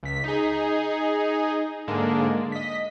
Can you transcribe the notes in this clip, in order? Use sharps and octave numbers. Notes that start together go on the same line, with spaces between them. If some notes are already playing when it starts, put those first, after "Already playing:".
C#2 B6
D#4 G#4
G#2 D3 G#3 A#3 D4
D#5 B6